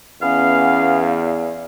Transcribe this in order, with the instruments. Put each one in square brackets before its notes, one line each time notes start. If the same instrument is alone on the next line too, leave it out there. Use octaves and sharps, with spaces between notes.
[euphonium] E2 [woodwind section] B3 C#4 F5